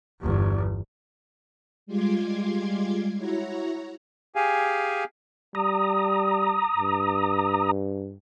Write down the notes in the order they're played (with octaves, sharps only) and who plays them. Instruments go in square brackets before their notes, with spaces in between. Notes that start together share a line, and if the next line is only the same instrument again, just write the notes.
[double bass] G1 E2
[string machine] G3 G#3 F4 C6 D6 G#6
E4 F#4 C#5 A#5
[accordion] G4 G#4 F5 G#5
[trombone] G3 [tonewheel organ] A#5 D#6
[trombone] G2